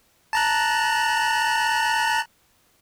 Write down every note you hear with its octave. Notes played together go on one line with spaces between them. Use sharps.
A5 A#5 F#6